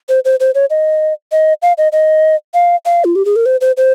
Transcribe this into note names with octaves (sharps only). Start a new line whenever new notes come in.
C5
C5
C5
C#5
D#5
D#5
F5
D#5
D#5
F5
F5
F4
G4
G#4
A#4
C5
C5
C5